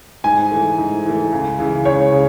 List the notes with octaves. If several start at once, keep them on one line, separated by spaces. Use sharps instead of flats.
G#2 G#5
E3 A3
G#2
E3 A3
C#2
C#3 E3
C#2 C#5
C#3